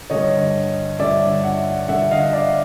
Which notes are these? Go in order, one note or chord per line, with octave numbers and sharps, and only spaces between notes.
G2 D3 C#5 D#5
G2 D3 D5 E5
E5 F#5
G2 D3 E5 F#5
D#5 F5
D5 E5